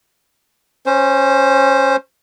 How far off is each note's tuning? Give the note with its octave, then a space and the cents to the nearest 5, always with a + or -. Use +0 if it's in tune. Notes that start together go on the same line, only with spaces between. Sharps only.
C#4 -20 C5 +0